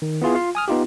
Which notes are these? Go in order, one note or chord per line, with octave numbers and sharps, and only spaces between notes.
D#3
B3 E4 F4 G#4
F4 F5
G#5 D#6 F6
B3 D#4 F4 G4